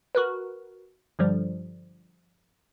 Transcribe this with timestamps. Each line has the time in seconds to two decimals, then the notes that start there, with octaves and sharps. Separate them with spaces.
0.15 F#4 A#4 B4
1.19 G2 D3 F3 G3